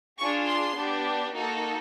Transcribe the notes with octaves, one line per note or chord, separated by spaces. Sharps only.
D4 F4 G#4 C#6
C6
B3 D4 G4
A#3 D#4 F#4 A4